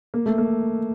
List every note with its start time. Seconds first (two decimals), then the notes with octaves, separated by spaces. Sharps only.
0.14 A#3
0.26 A3
0.38 A#3